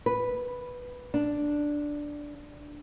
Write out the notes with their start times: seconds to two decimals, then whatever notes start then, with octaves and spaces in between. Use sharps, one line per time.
0.06 B4
1.14 D4